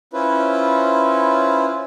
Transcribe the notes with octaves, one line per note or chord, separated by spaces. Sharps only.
C#4 E4 F4 B4 C5